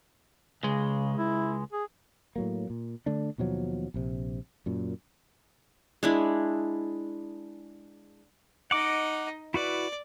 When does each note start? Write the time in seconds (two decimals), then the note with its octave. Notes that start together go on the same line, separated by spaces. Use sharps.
0.63 C#2 C#3 G#3
1.18 E4
1.72 G#4
2.36 A2 F#3 A#3
2.70 A#2
3.06 D3 A3 D4
3.38 D#2 B2 F3 F#3
3.94 A#1 C3
4.66 F#2 A#2
6.03 G#3 D4 E4
8.71 D#4 D#5 F#5 D6
9.54 E4 F#4 B4 D5